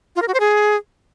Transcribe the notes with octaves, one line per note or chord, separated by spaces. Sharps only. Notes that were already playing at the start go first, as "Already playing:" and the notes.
F4
A#4
F#4
C5
G#4